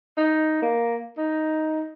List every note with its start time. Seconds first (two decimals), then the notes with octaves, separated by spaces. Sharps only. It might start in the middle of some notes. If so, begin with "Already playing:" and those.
0.17 D#4
0.62 A#3
1.18 D#4